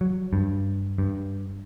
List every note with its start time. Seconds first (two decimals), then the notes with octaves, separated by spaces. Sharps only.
0.01 F#3
0.33 G2
0.98 G2